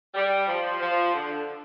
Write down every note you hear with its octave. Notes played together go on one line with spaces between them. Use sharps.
G3
F3
F3
D3